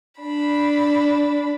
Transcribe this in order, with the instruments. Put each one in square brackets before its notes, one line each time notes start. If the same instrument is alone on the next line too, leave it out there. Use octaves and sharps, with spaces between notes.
[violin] D4 B5